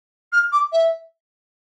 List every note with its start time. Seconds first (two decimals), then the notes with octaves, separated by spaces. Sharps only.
0.32 F6
0.52 D6
0.72 E5